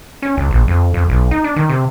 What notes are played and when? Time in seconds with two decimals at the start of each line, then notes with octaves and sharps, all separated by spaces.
0.22 C#4
0.37 C#2
0.51 A#1
0.68 F2
0.94 F2
1.09 B1
1.31 D#4
1.44 D4
1.56 D#3
1.69 C3